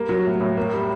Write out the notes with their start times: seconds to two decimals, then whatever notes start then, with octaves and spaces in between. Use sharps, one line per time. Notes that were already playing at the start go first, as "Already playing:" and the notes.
Already playing: G3 A#3
0.09 F#3
0.26 A2
0.41 A2
0.57 A#3
0.74 G3